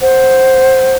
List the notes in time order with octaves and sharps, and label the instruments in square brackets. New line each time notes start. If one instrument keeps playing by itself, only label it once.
[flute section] C5 F#5